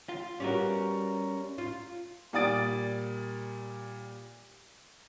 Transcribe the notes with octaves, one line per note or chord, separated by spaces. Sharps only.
F4
G3 B3 C#4 F#4 A#4
F4
A#2 G3 D5 D#6 A6 D7